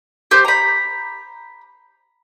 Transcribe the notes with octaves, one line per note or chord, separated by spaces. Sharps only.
G4 C5 G6
A#5 B5